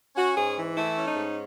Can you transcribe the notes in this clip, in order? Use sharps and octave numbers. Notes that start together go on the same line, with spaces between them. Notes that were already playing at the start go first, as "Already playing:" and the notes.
C#4 F#4
G#2 G#4
E3
A3 E4
C#4
D#4
G#2